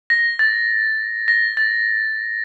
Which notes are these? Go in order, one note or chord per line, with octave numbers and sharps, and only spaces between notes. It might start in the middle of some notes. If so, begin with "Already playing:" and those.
A#6
A6
A#6
A6